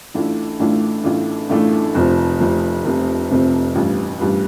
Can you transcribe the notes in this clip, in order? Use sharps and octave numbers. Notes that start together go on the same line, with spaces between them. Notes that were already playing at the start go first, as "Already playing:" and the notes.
A1 A2 A3 D4 F4
A1 A2 A3 D4 F4
A1 A2 A3 D4 F4
A1 A2 A3 D4 F4
F1 F2 C3 F3
F1 F2 C3 F3
F1 F2 C3 F3
F1 F2 C3 F3
A1 G2 G3 F4
A1 G2 G3 F4